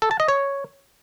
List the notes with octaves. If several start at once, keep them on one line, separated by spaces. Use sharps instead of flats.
A4
A5
D#5
C#5